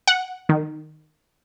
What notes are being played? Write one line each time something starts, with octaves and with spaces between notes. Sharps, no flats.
F#5
D#3